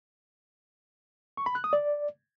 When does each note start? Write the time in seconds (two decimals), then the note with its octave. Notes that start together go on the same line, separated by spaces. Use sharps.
1.37 C#6
1.46 B5
1.55 F#6
1.64 D#6
1.73 D5